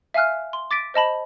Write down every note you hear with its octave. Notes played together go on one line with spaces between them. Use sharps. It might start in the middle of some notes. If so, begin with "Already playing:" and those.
E5 F5 G#5 F6 F#6
C6
D6 A6 B6 D7
C5 D#5 A5 B5